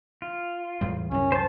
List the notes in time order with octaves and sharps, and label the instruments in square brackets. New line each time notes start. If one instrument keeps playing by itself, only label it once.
[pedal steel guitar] F4
[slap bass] E2 A2 G3
[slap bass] C2 F#2 [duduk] C#4
[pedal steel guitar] C5 A5